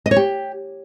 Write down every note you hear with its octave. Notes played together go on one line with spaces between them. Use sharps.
D#5
C#5
G4